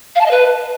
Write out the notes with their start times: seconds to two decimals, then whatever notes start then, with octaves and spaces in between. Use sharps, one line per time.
0.15 F5
0.21 A5
0.26 D#5
0.31 B4